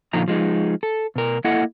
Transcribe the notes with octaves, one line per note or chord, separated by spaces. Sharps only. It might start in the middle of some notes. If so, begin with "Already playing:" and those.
A#2 D3 F3 D#4 A#5
F3 G#3 D#4
A4
B2 A#4
A#3 E4 A4 D#5 F#5